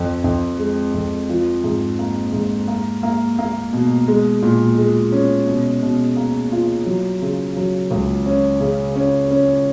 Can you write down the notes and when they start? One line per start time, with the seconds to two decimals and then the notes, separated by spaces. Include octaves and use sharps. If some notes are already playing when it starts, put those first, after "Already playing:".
Already playing: F2
0.24 F2
0.59 G#3
0.94 F2
1.29 F3
1.64 G#2
1.99 A#3
2.33 G#2
2.68 A#3
3.03 A#3
3.38 A#3
3.73 B2
4.08 G#3
4.42 A#2
4.78 G#3
5.12 C#4
5.47 B2
5.82 B2
6.16 A#3
6.52 F4
6.86 F#3
7.22 C#3
7.57 F#3
7.91 C#2
8.26 C#4
8.60 C#3
8.96 C#4
9.31 C#4